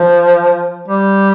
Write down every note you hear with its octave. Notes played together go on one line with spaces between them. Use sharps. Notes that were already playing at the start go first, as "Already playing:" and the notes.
Already playing: F3
G3